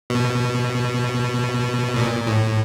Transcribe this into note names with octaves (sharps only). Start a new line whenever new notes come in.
B2
A#2
A2